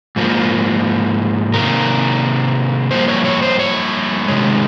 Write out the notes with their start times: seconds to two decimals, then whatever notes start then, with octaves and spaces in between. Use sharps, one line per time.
0.16 G#2 F3 A#3
1.53 C3 D#3 A#3 A#4
2.91 G2 F3 A#3 C5
3.08 C#5
3.25 C#5
3.42 C5
3.59 C#5
4.28 C3 D#3 G#3